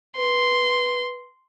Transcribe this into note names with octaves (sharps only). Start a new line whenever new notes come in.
B4 C6